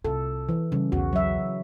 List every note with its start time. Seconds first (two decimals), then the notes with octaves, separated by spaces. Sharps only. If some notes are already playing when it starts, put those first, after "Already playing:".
0.05 C2 F4 A4
0.49 E3
0.72 C#3 G3
0.92 B1 E2 F#4
1.13 F#3 E5